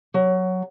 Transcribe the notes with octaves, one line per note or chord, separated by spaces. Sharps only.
F#3